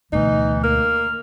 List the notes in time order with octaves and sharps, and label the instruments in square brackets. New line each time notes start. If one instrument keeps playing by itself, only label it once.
[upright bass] D2 B2 [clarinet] E3 [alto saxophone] D#4
[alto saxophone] A#3 [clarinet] F6